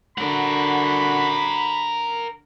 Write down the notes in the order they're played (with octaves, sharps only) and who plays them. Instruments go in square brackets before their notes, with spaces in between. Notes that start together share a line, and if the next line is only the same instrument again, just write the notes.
[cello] D3 F#4 [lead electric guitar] A#4 F#5 [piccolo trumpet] B5